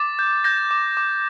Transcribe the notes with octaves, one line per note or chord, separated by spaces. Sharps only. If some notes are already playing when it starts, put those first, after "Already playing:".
Already playing: D6 A6
G6
G6 A#6
D6
D6